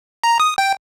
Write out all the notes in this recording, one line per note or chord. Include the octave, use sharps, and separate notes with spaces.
A#5
D#6
G5